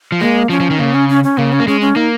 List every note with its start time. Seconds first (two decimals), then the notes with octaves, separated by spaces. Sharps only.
0.12 F3
0.21 G#3 A#3
0.50 F3 C#4
0.60 F3
0.70 D#3
0.79 C#3 A#3
0.94 C#4
1.09 C#4
1.24 C#4
1.38 C#3 A#3
1.53 C#4
1.60 A#3
1.68 G#3 C#4
1.81 C#4
1.96 A#3 D#4